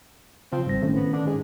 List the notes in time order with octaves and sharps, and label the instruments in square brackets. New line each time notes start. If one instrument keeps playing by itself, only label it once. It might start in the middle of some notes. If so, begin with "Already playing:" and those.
[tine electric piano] C#3 [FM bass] F3 [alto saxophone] C4
[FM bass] G#1 [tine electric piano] G3 A#6
[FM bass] A2 [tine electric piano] D#3 C#4
[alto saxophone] B3
[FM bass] D3 [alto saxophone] D4
[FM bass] G#2 [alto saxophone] G#4